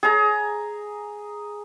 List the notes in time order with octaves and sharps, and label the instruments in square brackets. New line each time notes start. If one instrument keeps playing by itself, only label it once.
[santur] G#4 A#5